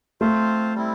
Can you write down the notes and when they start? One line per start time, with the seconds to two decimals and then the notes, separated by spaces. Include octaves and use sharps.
0.21 A3 C4 F4 C5 F5
0.75 G3 C4 E4